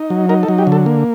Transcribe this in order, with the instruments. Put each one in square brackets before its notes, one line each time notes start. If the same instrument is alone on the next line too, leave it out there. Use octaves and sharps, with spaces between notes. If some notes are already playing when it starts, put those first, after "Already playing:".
Already playing: [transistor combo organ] D#4
F#3
D#4 A#4
A4
F#3
G4
D3
A4
A#3